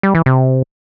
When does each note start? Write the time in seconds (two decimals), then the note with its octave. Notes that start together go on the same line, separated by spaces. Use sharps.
0.03 G3
0.15 E3
0.26 C3